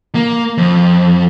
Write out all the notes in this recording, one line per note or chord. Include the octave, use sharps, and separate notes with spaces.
A#3
F2